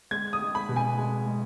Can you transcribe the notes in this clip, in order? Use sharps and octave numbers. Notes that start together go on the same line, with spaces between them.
G#3 G#6
D#6
G#3
B5
B2
G#5
G#3
G#3